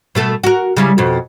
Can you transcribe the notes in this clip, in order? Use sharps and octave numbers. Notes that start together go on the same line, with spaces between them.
B2 A3 A4
F#4 A#4
C#3 G3 E4
F2 B2